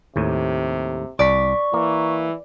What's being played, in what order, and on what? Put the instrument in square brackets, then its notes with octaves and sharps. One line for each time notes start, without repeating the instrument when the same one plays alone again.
[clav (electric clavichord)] D#2 A2 [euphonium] C3
[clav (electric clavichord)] C2 [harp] D5 B6 [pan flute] C#6
[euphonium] E3 [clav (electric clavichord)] A#3